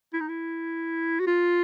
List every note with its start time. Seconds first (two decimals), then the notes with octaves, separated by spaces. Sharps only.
0.14 E4
0.20 D#4
0.28 E4
1.20 F#4
1.27 F4